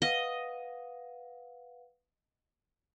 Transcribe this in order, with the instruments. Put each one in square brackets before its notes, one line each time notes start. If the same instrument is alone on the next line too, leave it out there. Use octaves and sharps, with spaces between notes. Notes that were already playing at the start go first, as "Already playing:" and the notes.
[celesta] B4 F5 F#5 [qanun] D#5